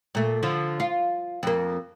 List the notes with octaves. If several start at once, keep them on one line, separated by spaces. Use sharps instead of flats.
A#2 A3
D3 F3
F4
F2 A#3